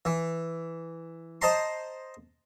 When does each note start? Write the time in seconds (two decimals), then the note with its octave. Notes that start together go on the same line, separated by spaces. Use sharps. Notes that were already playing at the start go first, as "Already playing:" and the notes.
0.05 E3
1.42 C5 D#5 A5 A#5 C6